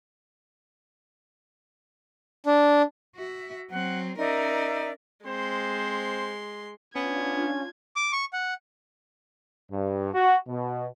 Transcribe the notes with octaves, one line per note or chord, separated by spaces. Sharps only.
D4
F#4 E5
F#3 C4 F#5
C#4 D#4 A#4 D5 E5
G#3 C4 C5 C6
B3 C#4 D4 F4 G#6
D6
C#6
F#5
G2
F#4
B2